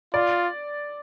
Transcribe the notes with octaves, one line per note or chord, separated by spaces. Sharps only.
F4 D5